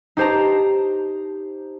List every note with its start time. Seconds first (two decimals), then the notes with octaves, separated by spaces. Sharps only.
0.17 D#4 G4 C5 A5 A#5